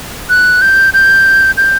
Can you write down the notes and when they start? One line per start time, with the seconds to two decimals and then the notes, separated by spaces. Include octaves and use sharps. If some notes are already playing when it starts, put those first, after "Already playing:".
0.30 F#6
0.62 G6
0.94 G6
1.57 G6